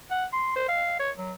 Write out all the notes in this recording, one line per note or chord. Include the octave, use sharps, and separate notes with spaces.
F#5
C6
C5
F5
C#5
F#3